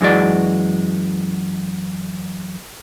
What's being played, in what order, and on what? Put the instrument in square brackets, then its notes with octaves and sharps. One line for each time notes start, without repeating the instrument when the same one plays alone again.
[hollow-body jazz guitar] F#2 E3 G#3 F#4 D5